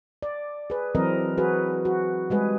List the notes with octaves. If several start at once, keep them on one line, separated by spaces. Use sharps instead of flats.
D5
G#4 B4
E3 F#3 C4 A#4 D#5
F#4 G#4 B4
F#4
G3 G#3 G#4 B4